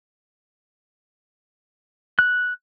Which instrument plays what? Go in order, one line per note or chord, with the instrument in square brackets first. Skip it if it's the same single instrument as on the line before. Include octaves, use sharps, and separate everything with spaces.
[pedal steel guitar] F#6